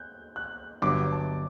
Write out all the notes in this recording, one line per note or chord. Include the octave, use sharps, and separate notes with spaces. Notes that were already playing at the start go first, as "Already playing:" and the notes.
Already playing: F#6 G6
F#6
G1 G2 F#3 D6
A5